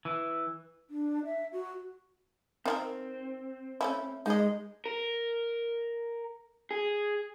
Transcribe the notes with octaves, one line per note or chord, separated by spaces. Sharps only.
E3
D4
E5
F#4
D#3 C4 E4 A#4
A3 C#4 E4
G#3 D#4 D#5
A#4
G#4